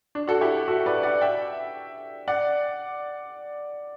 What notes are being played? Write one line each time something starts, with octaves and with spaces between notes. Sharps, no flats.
D4
F#4 A4
E4 G4
F#4 A4
B4 D5
D5 F#5
E5 G5
D5 F#5